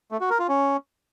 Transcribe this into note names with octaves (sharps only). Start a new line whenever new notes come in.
A3
F#4
A#4
F4
C#4